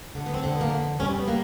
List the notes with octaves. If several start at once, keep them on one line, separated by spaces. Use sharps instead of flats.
D3
B3
C4
D3
B3
A#3
F2 B3
G3 C#4
C4
B3
D3 A#3